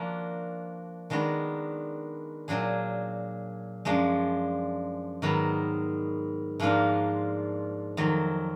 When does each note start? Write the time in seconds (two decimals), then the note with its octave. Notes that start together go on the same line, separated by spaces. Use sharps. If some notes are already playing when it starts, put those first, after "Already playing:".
Already playing: F3 A#3 D4 F#4
1.10 D#3 G#3 B3 D4 F#4
2.48 A#2 F#3 D4 G#4
3.85 F#2 F3 G#3 D4
5.22 G#2 D#3 F#3 B3
6.60 G#2 F3 A#3 D4 F4
7.97 F2 D#3 F#3